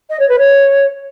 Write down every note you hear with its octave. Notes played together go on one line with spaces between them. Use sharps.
D#5
C#5
B4
C#5